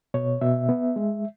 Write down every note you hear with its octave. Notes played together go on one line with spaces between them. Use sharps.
B2 C#5
B2 E5
B3
G#3